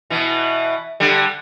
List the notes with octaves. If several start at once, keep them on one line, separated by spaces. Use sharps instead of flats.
B2 E3
D3 G3